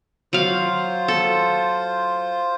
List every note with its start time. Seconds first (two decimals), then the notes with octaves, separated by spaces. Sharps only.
0.33 F#3 F4 C5 F5
1.08 A4